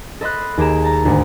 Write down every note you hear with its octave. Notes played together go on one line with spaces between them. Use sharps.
A4 D#5 B5 C6 F#6
D#2 G4 G#4 A#5 E7
A5 A#5
G#1 D2